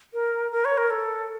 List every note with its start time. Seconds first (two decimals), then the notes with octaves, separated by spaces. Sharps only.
0.13 A#4
0.52 A#4
0.65 C#5
0.77 A#4
0.90 A4